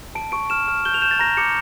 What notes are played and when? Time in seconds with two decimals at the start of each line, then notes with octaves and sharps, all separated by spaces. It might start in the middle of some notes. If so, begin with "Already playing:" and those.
0.15 A5 D7
0.32 C#6 D7
0.50 F6 E7
0.68 F6
0.85 G6 G7
0.94 F7
1.02 G6 E7
1.11 A6
1.19 A#5 A#6
1.37 D6 C#7